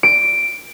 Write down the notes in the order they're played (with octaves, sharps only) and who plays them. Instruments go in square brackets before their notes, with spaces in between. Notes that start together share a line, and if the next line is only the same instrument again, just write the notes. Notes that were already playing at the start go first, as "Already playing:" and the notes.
[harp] D7